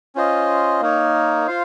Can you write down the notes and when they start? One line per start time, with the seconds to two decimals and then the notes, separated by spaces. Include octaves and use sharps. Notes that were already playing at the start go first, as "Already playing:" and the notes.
0.15 C#4 F4 C5 D#5
0.81 A#3 D#4 A#4 C#5
1.47 F4 C5 F5